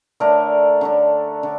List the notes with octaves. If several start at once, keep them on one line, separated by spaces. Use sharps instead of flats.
D3 A3 D4 A#4
D3 A3 D4
D3